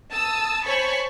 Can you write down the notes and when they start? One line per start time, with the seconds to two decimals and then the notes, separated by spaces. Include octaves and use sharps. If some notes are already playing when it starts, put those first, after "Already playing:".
0.11 A5 D#6 E6
0.65 C5 C#5 G#5 A5 B5 C#6